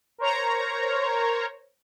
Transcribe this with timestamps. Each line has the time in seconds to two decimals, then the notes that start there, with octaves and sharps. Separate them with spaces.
0.18 A#4 C5 C#5 A#5